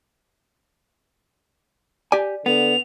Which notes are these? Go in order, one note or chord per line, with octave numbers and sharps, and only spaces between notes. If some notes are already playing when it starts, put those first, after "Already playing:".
G4 D5 G#5
D3 B3 F7